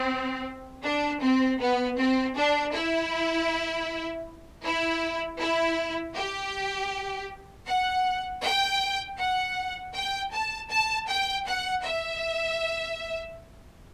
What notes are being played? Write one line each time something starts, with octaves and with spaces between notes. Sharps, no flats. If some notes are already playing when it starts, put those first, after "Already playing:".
Already playing: C4
D4
C4
B3
C4
D4
E4
E4
E4
G4
F#5
G5
F#5
G5
A5
A5
G5
F#5
E5